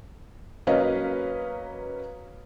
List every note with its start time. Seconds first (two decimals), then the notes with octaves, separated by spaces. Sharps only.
0.67 F#3 A#3 C#4 B4 D#5 F5